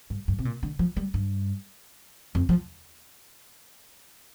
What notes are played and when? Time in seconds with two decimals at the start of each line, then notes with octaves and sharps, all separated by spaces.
0.10 G2
0.28 G2
0.39 C3
0.45 A#2
0.63 D3
0.79 F3
0.97 G3
1.14 G2
2.35 F2
2.49 F3